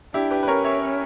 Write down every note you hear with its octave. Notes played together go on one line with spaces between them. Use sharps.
D4 E4 G4
G4 B4
B4
C#4 A#4 C#5
C#5 E5